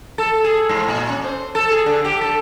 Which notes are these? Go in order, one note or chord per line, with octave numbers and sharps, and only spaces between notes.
A4
G#4
G#2
A#2
C#4
C5
A4
G#4
D3
G4
A4